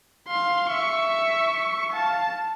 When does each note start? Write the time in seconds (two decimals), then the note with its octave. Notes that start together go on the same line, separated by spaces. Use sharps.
0.28 F5 C6
0.69 E5 C#6
1.10 C#6
1.92 F5 A5